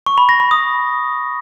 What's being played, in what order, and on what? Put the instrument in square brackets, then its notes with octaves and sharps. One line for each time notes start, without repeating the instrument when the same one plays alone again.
[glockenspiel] C#6
B5
A#6
B5
D#6